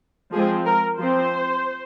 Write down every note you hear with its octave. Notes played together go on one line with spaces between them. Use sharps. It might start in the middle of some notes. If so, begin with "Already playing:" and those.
F3 G#3 C4 G#4
A#4
F3 C4 C5